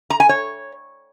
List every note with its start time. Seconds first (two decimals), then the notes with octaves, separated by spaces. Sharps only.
0.10 A#5
0.20 G#5
0.29 C#5